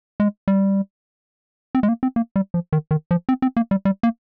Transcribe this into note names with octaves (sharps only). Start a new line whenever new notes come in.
G#3
G3
C4
G#3
A#3
C4
A#3
G3
F3
D#3
D#3
F3
C4
C4
A#3
G3
G3
A#3